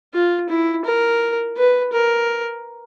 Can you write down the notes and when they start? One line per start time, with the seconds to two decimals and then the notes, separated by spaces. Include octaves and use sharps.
0.14 F4
0.49 E4
0.85 A#4
1.57 B4
1.93 A#4